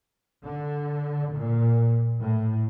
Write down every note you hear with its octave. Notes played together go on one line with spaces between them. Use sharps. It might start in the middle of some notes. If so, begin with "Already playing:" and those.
D3
A#2
A2